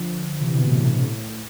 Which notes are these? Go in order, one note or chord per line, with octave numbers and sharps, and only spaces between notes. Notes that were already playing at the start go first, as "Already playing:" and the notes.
Already playing: D3 F3
C3 E3
B2 D3
A2 C3
A2 C3
B2
A2